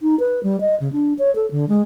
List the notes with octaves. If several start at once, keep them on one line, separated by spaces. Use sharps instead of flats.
D#4
B4
G3
D#5
C#3
D4
C#5
A4
D3
G#3